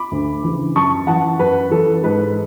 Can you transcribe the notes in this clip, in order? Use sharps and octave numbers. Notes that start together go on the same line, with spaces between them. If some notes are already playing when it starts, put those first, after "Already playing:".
Already playing: B5 D6
D2
C#3 E3
F#2 A5 C#6
E3 F#5 A5
F#2 B4
E3 A4
G#2 B4